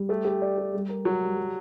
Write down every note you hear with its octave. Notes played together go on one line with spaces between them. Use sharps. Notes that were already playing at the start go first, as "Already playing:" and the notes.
Already playing: G3
A3 G4
G4
D5
G4
G3
A#4
F#3 G4
G3
G3